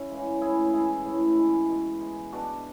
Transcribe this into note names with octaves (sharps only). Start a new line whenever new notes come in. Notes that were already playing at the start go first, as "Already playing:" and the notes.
Already playing: C#4 E4
C#3 E3 G#3
A2 E4 G#4
E3 G#3 E4 G#4
A2
E3 G#3
B2
G#3
B2 D4 F#4